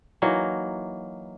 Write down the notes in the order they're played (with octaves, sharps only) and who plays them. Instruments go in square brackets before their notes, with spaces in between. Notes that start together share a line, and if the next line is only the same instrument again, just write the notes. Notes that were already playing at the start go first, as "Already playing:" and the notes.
[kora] E3 F#3 A#3 D#4